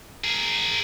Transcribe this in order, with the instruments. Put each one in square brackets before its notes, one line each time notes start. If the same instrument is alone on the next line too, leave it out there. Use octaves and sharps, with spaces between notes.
[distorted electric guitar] G#4 A#4